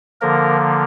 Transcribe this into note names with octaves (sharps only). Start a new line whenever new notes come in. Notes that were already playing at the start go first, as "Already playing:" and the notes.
D3 F3 A#3 A#4